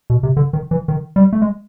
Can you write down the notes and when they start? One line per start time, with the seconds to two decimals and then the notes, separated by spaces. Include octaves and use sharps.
0.10 B2
0.23 C3
0.37 D3
0.53 D#3
0.71 E3
0.88 D#3
1.16 G3
1.33 A3
1.42 G#3